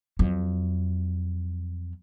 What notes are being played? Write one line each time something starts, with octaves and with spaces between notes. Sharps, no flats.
F2 F#3